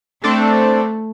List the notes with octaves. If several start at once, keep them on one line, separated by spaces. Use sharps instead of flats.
A3 C4 D4 A4